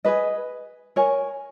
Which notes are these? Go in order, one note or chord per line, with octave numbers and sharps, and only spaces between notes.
G#4 B4 D#5
A#4 C#5 G#5